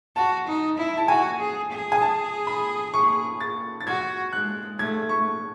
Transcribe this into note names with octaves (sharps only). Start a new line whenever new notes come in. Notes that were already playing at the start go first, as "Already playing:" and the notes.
F#4 A5
D#4
E4
A5
F#4 G#5
G#4
G#4
G#5
A5
B5
C#6
A6
A6
F#4 G#6
G#3 F#6
A3 G#6
C#6